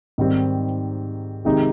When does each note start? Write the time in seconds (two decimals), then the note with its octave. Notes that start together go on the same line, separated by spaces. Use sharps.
0.18 G#2 D#3 G3 C4
1.45 C3 D#3 G#3 D#4 G4